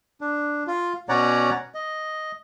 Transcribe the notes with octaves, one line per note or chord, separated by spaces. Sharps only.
D4
F4
B2 C#4 C#5 D5 F#5 A#5
D#5